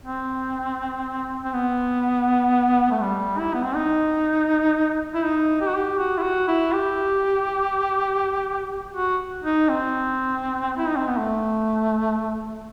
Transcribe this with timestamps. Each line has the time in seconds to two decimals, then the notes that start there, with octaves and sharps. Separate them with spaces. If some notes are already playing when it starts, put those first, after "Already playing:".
0.05 C4
1.44 C4
1.53 B3
2.92 A3
3.02 G3
3.39 E4
3.54 B3
3.65 C4
3.75 D#4
5.14 E4
5.24 D#4
5.61 G4
5.68 F#4
5.75 G4
5.99 F#4
6.18 E4
6.22 F#4
6.48 E4
6.73 G4
8.95 F#4
9.44 D#4
9.69 C4
10.77 E4
10.88 D#4
10.97 C4
11.07 B3
11.18 A3